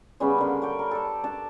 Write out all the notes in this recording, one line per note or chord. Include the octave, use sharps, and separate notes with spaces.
C#3 G3 B3 C#4
D3 A#3
C#5 D5 G5
A#4
A4 D5
D4 D5 A5